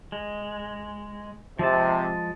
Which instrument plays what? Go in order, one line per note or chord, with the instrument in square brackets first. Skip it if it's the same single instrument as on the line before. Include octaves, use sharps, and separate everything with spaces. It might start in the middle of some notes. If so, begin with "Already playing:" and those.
[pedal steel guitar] G#3
[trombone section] C3 [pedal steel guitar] F3 G#3 A5